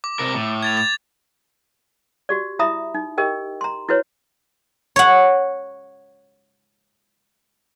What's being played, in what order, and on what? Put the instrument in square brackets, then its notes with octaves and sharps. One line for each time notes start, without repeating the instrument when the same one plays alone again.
[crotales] D6
[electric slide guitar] C3 A#4
A2
[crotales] G#6 A6 F7
A6
[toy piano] F#4 G4 D5
E4 E5 A#5 B5 D#6
D#4
G4 A#4 D#5 G5
A#5 C6
E4 F#4 B4 C#5
[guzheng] C#5 F#5